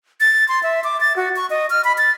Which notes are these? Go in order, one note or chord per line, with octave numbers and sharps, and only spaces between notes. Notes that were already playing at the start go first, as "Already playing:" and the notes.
A6
C6
E5
D6
A6
F#4
C#6
D#5
F6
B5
A6